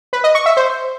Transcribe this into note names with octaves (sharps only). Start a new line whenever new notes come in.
B4
D#5
C#6
E5
C5